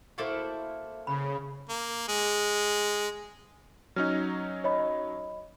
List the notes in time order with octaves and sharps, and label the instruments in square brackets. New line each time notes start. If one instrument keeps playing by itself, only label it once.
[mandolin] A#3 A4 C5 [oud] E4 F#4
[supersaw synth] C#3 [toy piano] B5
[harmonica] A#3
G#3
[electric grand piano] F#3 C#4 D#4 [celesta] F6
[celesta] C#5 D#5 B5